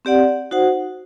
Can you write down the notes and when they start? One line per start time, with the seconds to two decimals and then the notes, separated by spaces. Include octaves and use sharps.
0.05 C4 G4 D5 F#5
0.51 D#4 F#4 C5 F#5